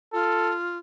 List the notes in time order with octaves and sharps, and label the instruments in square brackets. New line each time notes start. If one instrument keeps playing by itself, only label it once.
[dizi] F4 [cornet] A4